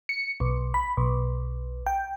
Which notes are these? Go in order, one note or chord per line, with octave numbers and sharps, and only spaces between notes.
C#7
B1
B5
B1
G5